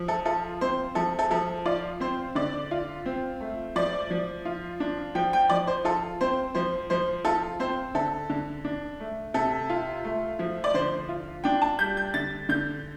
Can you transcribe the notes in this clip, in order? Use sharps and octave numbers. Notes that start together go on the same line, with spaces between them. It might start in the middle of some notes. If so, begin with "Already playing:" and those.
Already playing: F3
A4
F4 A4
C4 C5
F3 A4
A4
F3 A4
F4 D5
C4 C5
D3 D5
F4
C4
A3
F3 D5
F3
F4
D4
F3 G5
G5
F3 D5
C5
F4 A4
C4 C5
F3 C5
F3 C5
F4 A4
C4 C5
D3 A4
D3
D4
A3
C3 A4
F4
A3
F3
D5
D3 C5
F4
D4 G5
A5
G3 G6
G6
D3 A6
D3 G6